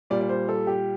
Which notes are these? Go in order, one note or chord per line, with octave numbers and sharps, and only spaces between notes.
A#2 G3 D5
D5
C5
A4
G4